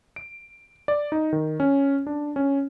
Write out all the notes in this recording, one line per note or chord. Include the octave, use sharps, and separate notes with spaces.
D7
D5
D#4
D#3
C#4
D4
C#4